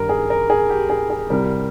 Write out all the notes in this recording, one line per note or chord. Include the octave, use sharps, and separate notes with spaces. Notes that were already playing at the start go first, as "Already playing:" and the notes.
Already playing: G2 D#3 G3 A#4
G#4
A#4
G#4
G4
G#4
G#4
C2 C3 G3 A#4